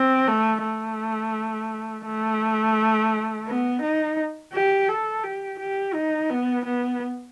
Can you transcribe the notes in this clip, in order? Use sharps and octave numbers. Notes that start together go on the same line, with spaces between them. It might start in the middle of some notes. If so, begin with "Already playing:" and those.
Already playing: C4
A3
A3
A3
B3
D#4
G4
A4
G4
G4
D#4
B3
B3